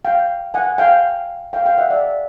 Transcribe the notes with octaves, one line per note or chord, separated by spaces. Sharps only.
F5 G5
F#5 G#5
F5 G5
F5 G5
F5 G5
E5 F#5
D5 E5